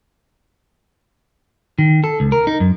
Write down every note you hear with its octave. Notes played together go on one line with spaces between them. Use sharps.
D#3
A4
C#2
A#4
D#4
F#2